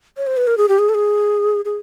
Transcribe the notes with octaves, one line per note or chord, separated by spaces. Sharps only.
C#5
C5
B4
A#4
G#4
G4
G#4
A4
G#4
G#4